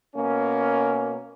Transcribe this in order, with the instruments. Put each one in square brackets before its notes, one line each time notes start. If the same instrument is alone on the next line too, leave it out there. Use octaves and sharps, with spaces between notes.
[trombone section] B2 A#3 C#4